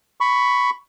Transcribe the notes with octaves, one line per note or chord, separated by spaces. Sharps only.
B5 C#6